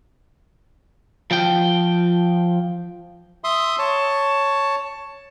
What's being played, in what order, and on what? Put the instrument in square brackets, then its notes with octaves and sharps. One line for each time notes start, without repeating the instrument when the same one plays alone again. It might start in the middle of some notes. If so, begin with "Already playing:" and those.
[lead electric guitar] F3 G5
[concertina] E5 C6 D#6
C#5 A5